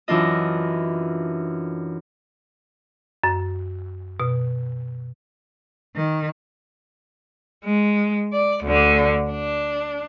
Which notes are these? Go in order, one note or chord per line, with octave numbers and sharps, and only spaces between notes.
F#2 E3 D4 F4 D#5
F#2
B2
D#3
G#3
D5
D2 D3
D4